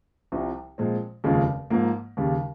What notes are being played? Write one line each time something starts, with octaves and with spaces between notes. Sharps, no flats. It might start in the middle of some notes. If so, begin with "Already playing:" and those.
C2 C3 F3
A#2 F3 G#3 C4
F1 D#2 C#3 F3 G#3
G#2 F3 A#3
D#2 C#3 G3